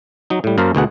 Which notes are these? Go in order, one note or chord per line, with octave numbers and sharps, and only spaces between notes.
F#3 D#4
A2 G3
F#2 A#3 A#4 C5 A5
D2 B2 G#4 F#5